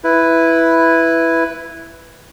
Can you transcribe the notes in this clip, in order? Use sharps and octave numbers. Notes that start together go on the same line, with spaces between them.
E4 B4